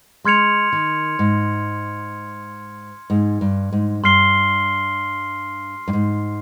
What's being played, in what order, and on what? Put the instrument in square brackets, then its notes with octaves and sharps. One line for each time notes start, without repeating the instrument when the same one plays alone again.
[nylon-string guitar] G#3 [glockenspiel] C6 F6 G#6 C#7 F7
[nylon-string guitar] D#3
G#2
G#2
G2
G#2
[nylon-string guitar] G2 [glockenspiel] C6 F6 C7 G7
[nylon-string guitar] G2
G#2